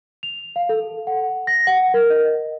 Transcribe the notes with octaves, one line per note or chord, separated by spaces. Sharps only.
F7
F5
A4
F#5
A#6
F#5
A#4
D#5